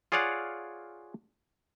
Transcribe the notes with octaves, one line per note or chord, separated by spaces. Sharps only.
F4 G#4 C#5 D5 F5 F#5